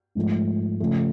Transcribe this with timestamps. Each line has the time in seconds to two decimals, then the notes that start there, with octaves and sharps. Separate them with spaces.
0.15 G#2 F3 A3
0.80 C#3 F3 A3